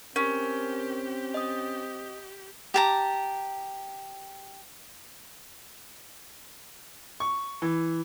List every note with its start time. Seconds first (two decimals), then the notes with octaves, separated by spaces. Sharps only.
0.16 C4 C#4 G4 A#4
1.34 D#5 D#6
2.74 G4 A5 A#5
7.20 C#6
7.62 E3